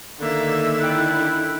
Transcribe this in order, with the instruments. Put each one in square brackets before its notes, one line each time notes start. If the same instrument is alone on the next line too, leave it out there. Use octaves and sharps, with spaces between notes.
[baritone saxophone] D3 [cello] D#3 [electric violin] A#3 E5
[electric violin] E4 [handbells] G5 F#6